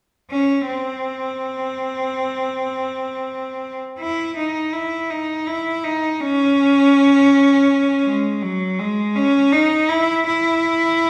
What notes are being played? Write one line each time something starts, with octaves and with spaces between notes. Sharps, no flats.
C#4
C4
E4
D#4
E4
D#4
E4
D#4
C#4
G#3
F#3
G#3
C#4
D#4
E4
E4